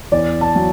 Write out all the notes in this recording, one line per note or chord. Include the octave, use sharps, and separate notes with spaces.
E2 D5
A5
F#3